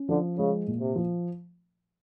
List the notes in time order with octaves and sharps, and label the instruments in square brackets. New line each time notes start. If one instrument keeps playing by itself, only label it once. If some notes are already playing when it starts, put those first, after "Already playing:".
Already playing: [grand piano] C#4
[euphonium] D3 [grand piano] F3
[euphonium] C#3 [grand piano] G#3
[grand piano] A#2
[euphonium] C3
[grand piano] F3